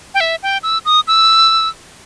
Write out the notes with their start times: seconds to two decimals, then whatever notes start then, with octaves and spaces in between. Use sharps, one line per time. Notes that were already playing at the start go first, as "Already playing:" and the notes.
0.14 G5
0.20 E5
0.43 G5
0.63 E6
0.85 D#6
1.07 E6